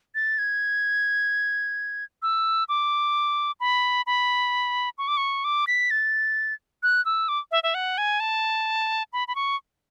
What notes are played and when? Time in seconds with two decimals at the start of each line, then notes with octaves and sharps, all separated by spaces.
0.15 A6
0.39 G#6
2.22 E6
2.69 D6
3.60 B5
4.07 B5
4.98 C#6
5.08 D6
5.17 C#6
5.44 D6
5.67 B6
5.91 A6
6.83 F#6
7.05 E6
7.29 D6
7.51 E5
7.63 E5
7.74 F#5
7.98 G#5
8.20 A5
9.13 B5
9.28 B5
9.35 C#6